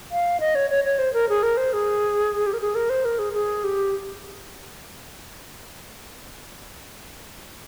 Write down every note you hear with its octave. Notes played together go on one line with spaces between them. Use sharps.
F5
D#5
C#5
C#5
C#5
C5
A#4
G#4
A#4
C5
G#4
G4
A#4
G#4
A#4
C5
A#4
G#4
G#4
G4